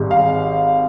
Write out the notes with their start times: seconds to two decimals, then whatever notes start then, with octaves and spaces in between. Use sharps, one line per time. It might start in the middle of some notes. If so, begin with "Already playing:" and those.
Already playing: G#1 G#2 G3
0.11 F5